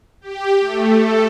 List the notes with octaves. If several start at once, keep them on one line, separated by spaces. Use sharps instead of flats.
G4
A3
A4